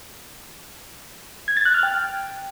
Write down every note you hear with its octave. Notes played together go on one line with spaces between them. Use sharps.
G#6
A6
F#6
F6
G5